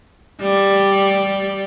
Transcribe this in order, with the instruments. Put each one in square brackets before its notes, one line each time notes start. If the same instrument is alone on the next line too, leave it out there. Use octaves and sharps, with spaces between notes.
[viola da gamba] G3